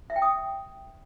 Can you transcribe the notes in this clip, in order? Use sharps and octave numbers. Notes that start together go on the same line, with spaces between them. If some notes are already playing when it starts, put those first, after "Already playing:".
E5
G5
D#6